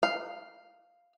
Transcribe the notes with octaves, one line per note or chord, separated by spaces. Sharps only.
F5